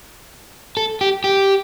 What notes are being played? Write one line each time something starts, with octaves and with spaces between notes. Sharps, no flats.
A4
G4
G4